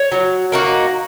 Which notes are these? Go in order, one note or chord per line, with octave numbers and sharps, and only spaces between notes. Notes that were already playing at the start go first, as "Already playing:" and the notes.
Already playing: C#5
F#3
A#3 D#4 F#4